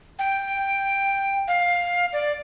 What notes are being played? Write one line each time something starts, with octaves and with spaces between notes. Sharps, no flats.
G5
F5
D5